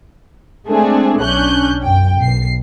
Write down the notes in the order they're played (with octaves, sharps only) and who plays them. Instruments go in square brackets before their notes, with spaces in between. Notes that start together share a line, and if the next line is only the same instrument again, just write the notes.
[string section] G#3 A3 C4 D4 G#4
B1 C#4 D4 F#6 G6
F#2 G5
B1 C7